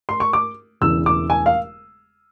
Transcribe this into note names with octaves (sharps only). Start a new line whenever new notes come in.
C6
C#6
D6
E1 E2 C#3 E3 E6
D6
G#5
F5